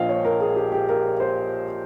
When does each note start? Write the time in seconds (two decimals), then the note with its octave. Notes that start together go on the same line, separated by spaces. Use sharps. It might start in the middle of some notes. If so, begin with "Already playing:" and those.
Already playing: A#1 A#2 F3 D#5 F5 G5
0.09 C#5
0.25 A#4
0.41 G#4
0.56 G4
0.72 G4
0.89 A#4
1.20 C5